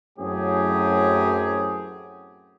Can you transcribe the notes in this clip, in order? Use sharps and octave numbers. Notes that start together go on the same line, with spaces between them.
F#2 A2 F#3 C4 G4 G#4